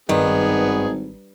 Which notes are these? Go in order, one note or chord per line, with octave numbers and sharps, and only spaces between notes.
G#1 G2 D#3 B3 G#4